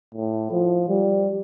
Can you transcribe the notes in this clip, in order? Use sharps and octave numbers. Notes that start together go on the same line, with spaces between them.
A2
F3
G3